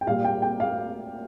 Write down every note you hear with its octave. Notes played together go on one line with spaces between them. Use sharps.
G5
A#2 G3 F5
G5
G5
F5